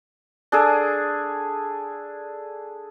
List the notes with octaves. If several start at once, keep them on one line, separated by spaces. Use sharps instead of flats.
D4 G#4 A4